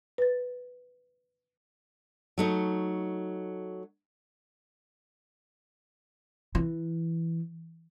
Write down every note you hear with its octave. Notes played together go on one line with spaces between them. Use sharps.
B4 A6
F#3 A3 D#4
E3